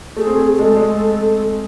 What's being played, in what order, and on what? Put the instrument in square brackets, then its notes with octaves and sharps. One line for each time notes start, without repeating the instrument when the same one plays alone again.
[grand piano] A3 [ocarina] G#4
[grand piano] C4
A3
[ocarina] G#4
[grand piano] G#3 [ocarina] A4
[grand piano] A3
G#3